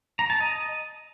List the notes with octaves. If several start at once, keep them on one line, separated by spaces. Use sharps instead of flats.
A#5
A5
D#5